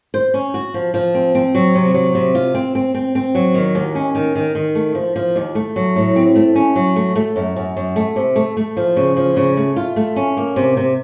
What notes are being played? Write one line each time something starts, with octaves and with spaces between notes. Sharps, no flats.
C5
C#4
F#4
F3
F3
C4
C4
F#3
C3
F#3
C3
F4
C4
C4
C4
C4
F#3
D#3
D#2
C#4
D#3
D#3
D#3
A3
F3
F3
D#2
A3
F#3
A2
C4
A3
C#4
F#3
A3
A3
F#2
F#2
F#2
A3
C3
A3
A3
F3
C#3
F3
C#3
A3
F4
A3
C#4
A#3
C3
C3